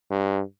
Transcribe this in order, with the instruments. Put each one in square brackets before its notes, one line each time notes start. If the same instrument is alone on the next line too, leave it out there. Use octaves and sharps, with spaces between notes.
[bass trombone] G2